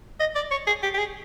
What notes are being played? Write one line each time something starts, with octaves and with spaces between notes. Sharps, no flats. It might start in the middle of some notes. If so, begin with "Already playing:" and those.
D#5
D5
C#5
G#4
G4
G4
G#4